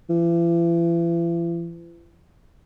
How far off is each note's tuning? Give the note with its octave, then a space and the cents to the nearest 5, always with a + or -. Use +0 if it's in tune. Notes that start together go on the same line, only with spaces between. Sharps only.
E3 +45